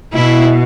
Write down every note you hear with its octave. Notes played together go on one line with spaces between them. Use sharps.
B2 E4